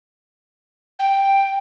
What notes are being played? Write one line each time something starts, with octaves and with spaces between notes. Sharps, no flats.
G5